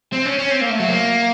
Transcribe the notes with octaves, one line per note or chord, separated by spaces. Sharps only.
C4
C#4
C#4
C4
A#3
A3
F#3
A#3